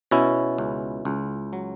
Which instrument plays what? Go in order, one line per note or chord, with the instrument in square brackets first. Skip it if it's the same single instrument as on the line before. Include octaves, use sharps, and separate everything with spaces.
[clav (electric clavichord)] B2 C#4 E4
C#2
C#2
F#3